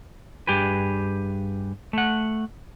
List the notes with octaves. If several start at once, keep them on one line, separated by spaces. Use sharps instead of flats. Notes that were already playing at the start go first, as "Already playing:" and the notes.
G2 G4 G#4 B4
A3 F#5